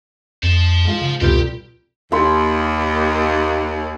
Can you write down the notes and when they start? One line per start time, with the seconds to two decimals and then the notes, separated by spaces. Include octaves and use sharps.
0.43 F2 C5 A5
0.85 G#2 F4
1.02 C#3
1.21 F1 C#2 B2 G3 F4 G4 G5 G6
2.12 D#2 B5 C6